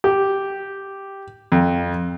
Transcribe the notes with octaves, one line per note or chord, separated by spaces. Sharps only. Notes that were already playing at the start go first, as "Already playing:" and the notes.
G4
F2